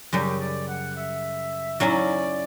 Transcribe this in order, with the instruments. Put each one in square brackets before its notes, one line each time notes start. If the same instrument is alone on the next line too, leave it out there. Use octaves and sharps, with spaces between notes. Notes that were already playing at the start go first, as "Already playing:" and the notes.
[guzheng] F#2 C#3 G3 [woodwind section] G4
[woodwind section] D5
F#5
E5
[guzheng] F#3 C#4 E4 [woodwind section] D5